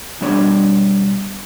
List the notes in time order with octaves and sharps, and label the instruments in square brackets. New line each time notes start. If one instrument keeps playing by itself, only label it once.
[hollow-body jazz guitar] B2 G3 D4 C#5